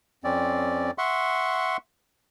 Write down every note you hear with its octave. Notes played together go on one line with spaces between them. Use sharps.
F2 C4 C#4 D5
E5 F#5 C6 C#6